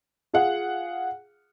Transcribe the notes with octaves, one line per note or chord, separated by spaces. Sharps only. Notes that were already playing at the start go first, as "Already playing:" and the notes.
F4 G#4 F5 F#5